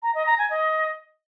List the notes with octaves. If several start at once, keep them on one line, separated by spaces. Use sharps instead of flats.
A#5
D#5
A#5
G#5
D#5